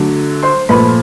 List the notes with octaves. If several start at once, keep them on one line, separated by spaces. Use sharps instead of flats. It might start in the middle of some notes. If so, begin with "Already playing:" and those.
Already playing: D3 F#3 A3
C5 C6
A#2 F3 A3 B4 B5